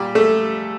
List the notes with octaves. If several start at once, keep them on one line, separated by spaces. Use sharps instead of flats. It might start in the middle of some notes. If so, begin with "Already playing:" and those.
Already playing: A#2 G3 G4
A3 A4